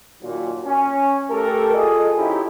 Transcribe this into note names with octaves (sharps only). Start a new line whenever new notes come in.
D#2 A#2 F#3
C#4 G#5
A3 G4 A4 A#4
F4 G#4 A4 D#5
F3 C#4 D#4 E4 G4